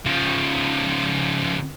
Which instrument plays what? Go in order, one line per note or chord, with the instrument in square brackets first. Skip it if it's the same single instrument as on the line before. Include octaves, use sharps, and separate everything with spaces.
[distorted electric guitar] C#3 F3